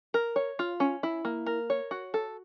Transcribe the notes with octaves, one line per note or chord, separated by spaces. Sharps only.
A#4
C#5
F4
C#4
E4
A#3
A#4
C#5
F#4
A4